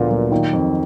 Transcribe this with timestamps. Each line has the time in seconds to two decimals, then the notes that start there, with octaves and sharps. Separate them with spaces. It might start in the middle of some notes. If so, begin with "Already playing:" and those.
Already playing: D2 A#2 D3 F3 B3
0.09 F#3
0.32 D#3
0.53 F2